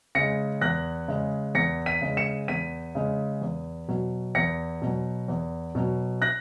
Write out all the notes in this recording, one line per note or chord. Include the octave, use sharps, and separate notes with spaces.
C#3 G#3 A#6 C#7
E2 F#6 A#6
C#3 G#3
E2 A#6 C#7
B6 D#7
C#3 G#3
C#7 E7
E2 B6 D#7
C#3 G#3
E2
B2 F#3
E2 A#6 C#7
B2 F#3
E2
B2 F#3
F#6 A#6